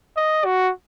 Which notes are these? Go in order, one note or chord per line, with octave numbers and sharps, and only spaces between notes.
D#5
F#4